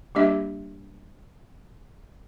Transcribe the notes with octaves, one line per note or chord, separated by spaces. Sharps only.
G3 A#3 D4 G4 D#5 E5